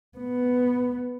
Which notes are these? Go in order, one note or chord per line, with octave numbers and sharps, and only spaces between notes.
B3